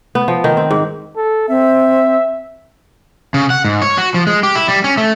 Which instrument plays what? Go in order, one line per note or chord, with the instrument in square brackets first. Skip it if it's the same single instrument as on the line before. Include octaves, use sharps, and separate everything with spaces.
[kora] B3
F3
D#3
C4
G#2
[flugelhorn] A4
[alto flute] C4 [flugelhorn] E5
[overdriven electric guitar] C#3
F#5
G#2
C#5
F#4
F3
G#3
G4
E4
G3
C#4
A3